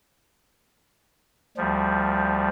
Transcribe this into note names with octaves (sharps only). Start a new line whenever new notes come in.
D2 F3 G3